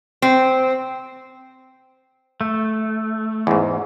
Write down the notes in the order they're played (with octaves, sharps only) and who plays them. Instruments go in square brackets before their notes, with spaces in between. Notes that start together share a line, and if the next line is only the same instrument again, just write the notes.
[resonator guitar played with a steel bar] C4
[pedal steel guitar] A3
[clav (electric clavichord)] E2 G#2